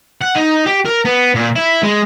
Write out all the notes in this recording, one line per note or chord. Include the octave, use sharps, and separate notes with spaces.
F#5
D#4
G4
A#4
B3
A#2
E4
G#3